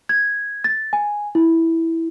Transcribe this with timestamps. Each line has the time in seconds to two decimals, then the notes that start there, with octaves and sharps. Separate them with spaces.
0.09 G#6
0.64 A6
0.93 G#5
1.35 E4